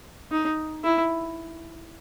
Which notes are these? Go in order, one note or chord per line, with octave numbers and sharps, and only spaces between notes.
D#4
E4